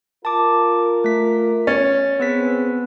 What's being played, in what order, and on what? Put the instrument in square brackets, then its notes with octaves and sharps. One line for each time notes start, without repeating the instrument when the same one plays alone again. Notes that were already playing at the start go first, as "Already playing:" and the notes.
[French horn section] F4 A#4 [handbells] A5 D6
[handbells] A3 B6
[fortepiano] C#4 [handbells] A6
[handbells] B3 B4 B6 [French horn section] C4 G#4